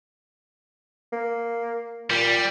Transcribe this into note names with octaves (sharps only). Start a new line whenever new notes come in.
A#3
A#2 G3